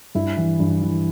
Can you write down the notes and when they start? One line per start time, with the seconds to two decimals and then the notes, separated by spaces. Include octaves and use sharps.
0.15 G2 E4
0.37 E3
0.60 G2
0.82 E3